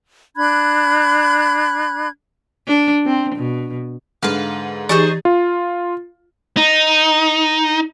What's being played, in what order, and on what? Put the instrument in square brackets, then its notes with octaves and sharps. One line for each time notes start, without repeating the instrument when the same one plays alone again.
[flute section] D4 B5 F#6 G#6
[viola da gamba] D4
C4
B2
[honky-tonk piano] G#2 D3 [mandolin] B4 F5
[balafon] E3 G4 [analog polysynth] D#4 G#4 [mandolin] C5 D#5 C#6 [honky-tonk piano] A6
[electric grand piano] F4
[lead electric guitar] D#4